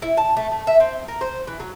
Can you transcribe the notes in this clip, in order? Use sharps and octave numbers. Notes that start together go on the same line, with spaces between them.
E4
A5
A3
A3
E5
C4
A#4
C5
E3
F#3